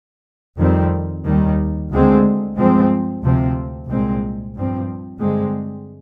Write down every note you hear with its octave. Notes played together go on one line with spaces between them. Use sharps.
F2 D#3 G3 C4
D#2 D#3 G3
D2 D3 G#3 C4
G2 F3 G#3 C4
D2 C3 F3 C4
C2 A#2 G#3 C4
G2 F3 C4
G2 D3 G#3 C4